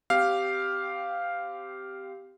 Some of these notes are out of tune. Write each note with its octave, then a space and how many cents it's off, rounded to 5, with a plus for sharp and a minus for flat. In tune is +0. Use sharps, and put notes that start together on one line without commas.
C4 -25 G4 -5 F5 +0